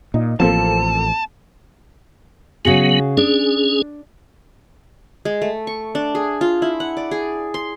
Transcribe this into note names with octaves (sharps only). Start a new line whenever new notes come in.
A#2 D#4
A1 F3 A#3 C4 A4 A5
C#3 F#3 B3 F#4 G#4
C#4 D4 G#4
G#3
A3
C#6
D4
G#4
F4
E4
F#5
D5
G#4
C6